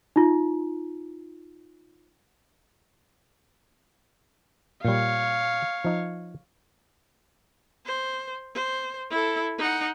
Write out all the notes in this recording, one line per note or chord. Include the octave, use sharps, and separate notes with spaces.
D#4 F4
A#2 G3 C#5 F5
F3 D#4
C5
C5
E4 A4
D#4 F#5